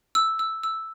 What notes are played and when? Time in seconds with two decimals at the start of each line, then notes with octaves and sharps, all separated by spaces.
0.15 E6
0.39 E6
0.63 E6